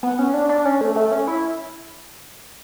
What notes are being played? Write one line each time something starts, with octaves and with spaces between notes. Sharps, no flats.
B3
C#4
D4
D4
C#4
A3
A3
C#4
E4